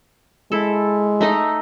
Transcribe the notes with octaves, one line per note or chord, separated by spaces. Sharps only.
G#3 E4 A4
A3 D#4 D#5